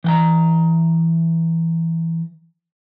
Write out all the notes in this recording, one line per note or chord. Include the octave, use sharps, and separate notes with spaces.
E3 G5 A#5